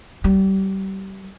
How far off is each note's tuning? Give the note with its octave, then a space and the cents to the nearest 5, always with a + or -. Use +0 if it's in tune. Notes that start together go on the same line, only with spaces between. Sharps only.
G3 -30